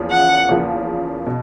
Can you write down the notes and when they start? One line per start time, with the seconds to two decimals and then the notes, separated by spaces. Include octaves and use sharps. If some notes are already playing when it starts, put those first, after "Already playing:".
Already playing: E2 C#3 F3 A#3
0.11 F#5
0.49 E2 C#3 F3 A#3
1.27 B2